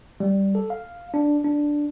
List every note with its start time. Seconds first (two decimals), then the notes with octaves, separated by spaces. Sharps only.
0.20 G3
0.55 A4
0.70 F5
1.14 D4
1.44 D4